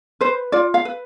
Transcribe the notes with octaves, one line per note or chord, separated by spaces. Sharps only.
B4 C5
F4 D5
F5
B4